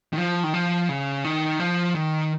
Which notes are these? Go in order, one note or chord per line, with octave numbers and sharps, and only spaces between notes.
D#3
F3
D#3
F3
C#3
D#3
F3
D#3